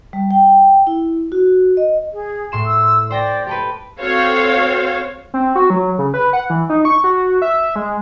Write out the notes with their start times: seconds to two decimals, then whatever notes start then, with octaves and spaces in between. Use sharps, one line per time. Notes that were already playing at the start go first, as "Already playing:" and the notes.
0.13 G3
0.31 G5
0.87 E4
1.32 F#4
1.77 D#5
2.13 G#4
2.52 A2 C6 E7
2.66 E6
3.11 C5 D5 G5 A#6
3.47 G4 A4 B4 G5
4.00 C4 F#4 A4 C5 C#5 F5
5.34 C4
5.55 F#4
5.70 F#3
5.99 C#3
6.14 B4
6.33 F#5
6.50 E3
6.70 D#4
6.85 C#6
7.04 F#4
7.42 E5
7.76 G#3